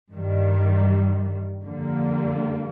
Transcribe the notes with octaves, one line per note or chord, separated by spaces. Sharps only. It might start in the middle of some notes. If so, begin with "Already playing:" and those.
G2 D#3 G3
F2 D3 G3 A#3